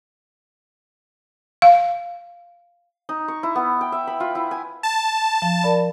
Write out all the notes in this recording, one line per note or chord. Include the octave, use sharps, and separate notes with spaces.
F5
D#4
C#6
E4
B3
G5
E5
B5
F4
E4
G#5
A5
F3
A#4 D5 B5